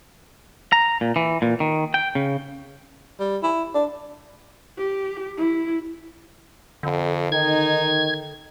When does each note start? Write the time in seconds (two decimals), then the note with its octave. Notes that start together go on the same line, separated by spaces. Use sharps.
0.72 A#5
1.01 A#2
1.16 E3
1.42 A#2
1.60 D#3
1.94 G5
2.15 C#3
3.20 G3
3.43 E4
3.75 D4
4.78 G4
5.37 E4
6.83 F2 D3
7.32 D#3 D#4 G#6